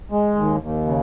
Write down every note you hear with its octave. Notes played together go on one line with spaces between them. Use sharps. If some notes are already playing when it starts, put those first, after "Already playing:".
G#3
D#2
D#2
C#3